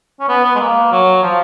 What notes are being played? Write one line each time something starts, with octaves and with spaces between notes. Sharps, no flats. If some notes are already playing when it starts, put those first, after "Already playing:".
C#4
B3
B3
G#3
A#3
F#3
F3